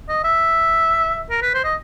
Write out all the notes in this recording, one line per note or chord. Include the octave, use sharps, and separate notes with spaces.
D#5
E5
A#4
B4
C5
D#5